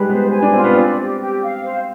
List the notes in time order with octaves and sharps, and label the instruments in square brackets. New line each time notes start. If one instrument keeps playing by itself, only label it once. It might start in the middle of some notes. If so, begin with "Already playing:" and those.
Already playing: [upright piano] G3 G#3 D#4 [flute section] B4
[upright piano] B3 [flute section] C5
[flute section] G#5
[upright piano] D4
[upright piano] C4 [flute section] F4
[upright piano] B3
[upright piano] C4 [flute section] D5
[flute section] G4
G4
F5
C5